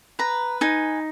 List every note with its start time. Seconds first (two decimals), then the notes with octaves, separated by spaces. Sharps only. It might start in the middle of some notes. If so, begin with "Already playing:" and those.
0.19 B4 A#5
0.61 D#4 G#5